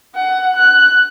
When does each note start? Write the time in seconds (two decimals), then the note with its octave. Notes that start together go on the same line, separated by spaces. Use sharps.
0.15 F#5
0.57 F#6